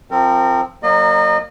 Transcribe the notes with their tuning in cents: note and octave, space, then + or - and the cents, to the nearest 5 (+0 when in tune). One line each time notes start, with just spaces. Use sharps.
F3 -15 C4 +0 A#4 -35
F#3 +0 A#3 +0 D#5 -35